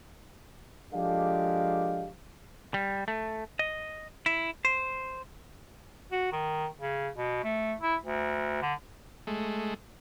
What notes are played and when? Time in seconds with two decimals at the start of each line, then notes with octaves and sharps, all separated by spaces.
0.94 F3 G#3 D4 G4 A4 F5
2.74 G3
3.08 A3
3.59 D#5
4.26 E4
4.65 C5
6.12 F#4
6.32 D#3
6.81 C#3
7.16 B2
7.44 A3
7.81 E4
8.04 D2
8.62 D3
9.27 G#3 A3